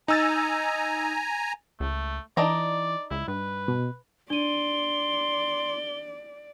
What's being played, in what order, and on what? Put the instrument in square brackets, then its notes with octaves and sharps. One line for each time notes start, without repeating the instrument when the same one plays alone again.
[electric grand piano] D#4 E6 A6 [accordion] G#5 A#5
[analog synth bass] C#2 [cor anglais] A3
[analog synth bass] E3 [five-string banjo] D4 D#4 A#5 [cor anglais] D5
[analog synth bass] C#2 [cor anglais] E4
[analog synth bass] G2 [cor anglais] B4
[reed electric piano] B2
[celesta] D4 D#7 [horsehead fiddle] D5 [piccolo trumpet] C6 [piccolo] G7